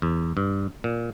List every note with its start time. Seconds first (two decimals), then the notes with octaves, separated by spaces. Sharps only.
0.02 E2
0.37 G2
0.84 A#2